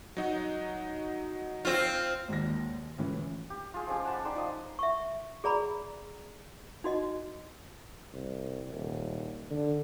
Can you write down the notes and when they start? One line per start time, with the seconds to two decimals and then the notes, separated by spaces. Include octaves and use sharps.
0.17 F#3 D#4 F#4
1.65 C4 F4
2.28 G#1 D#2 A#6
2.98 C#2 A2 E3 C#4
3.50 G4
3.74 F4 G#4
3.87 F3 G#3 C#4 G4
4.05 F#5 A5 B5
4.25 D#4 D5 G5 C6
4.36 F3 D#5
4.79 E5 C#6
5.44 G#4 D5 A#5 B5
6.84 D#4 F#4 D#5
8.13 C2
8.74 D#1
9.51 D3